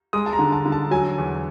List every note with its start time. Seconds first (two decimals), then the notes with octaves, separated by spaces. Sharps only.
0.13 G#3 D#6
0.26 A5
0.33 A#5
0.39 D3
0.52 A5
0.66 D3
0.72 A5
0.91 F#3 G#5
1.18 E2